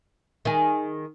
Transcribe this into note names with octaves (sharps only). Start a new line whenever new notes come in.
D#3 G#4